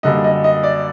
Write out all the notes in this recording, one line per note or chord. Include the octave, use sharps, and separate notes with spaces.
F#2 D3 G3 A#3 D#5
D#5
D#5
D5